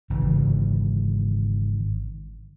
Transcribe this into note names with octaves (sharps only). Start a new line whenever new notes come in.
G#1 C#3 E3